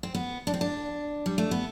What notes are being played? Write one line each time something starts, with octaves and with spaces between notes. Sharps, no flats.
C4
B3
D4
C4
D4
G3
A3
B3